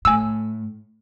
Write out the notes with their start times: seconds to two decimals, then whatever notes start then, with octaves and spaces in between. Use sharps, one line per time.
0.05 A2 G#5 E6